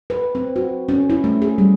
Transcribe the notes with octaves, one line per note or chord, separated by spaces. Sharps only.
B4
C4
F#4
C#4
E4
A3
G#4
G3